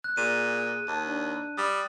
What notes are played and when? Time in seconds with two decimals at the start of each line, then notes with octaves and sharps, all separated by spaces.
0.04 F#6
0.17 A#2 G#4 D#7
0.88 D#2 A5
1.06 D4
1.58 G3 D#6